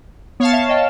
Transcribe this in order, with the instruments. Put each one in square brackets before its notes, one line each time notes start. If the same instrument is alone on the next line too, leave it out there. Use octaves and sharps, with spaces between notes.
[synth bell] B3 [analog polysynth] C#5 F5 A5
[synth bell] E5
D#5 G5